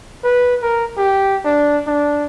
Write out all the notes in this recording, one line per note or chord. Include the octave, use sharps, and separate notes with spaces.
B4
A#4
G4
D4
D4